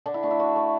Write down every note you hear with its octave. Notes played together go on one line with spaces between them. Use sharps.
D3 D4
E4
A3 D4
E4
D3 F#4
A3